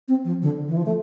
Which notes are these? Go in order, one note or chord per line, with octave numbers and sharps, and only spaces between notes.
C4
F3
D3
E3
F3
A3